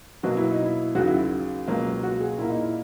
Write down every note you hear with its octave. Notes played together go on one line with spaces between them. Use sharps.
B2 F#3 A#3 F#4
E4
D#4
E4
D#2 C#3 F#3 F#4
E4
C#2 B2 F#3 A#3
F#4
G#4
A#2 A#3 E4
D#4
E4